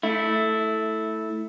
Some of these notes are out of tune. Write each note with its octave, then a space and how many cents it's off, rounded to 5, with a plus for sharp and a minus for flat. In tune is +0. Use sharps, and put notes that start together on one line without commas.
A3 +0 E4 -10